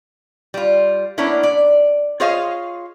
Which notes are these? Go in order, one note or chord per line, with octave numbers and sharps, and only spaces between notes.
G3 F4
A#3 B3 C#4 D4 E4
D5
F4 G#4 C5 C#5 D#5 F5